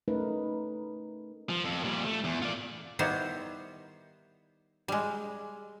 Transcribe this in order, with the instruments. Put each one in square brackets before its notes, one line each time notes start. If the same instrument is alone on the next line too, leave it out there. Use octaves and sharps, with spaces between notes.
[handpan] A3 C#4 D#4 A#4 B4
[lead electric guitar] F3
F2
A#2 G3
A3
E2
F4 D5
[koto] D#3 G3 B3 E4 C5 C#5
G3 G#3